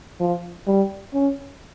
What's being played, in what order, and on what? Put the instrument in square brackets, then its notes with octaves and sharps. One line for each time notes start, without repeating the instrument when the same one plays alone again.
[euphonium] F3
G3
C#4